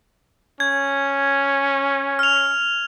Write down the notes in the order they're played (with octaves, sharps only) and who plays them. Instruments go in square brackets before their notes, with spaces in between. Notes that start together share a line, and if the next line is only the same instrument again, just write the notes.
[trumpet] C#4 [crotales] G#6
[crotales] F6 F7